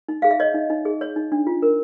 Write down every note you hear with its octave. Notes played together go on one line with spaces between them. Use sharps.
D#4
G#4 F5
E5
C#5 D#5
D#4
D#4
G#4
C#5
D#4
D4
F4
A#4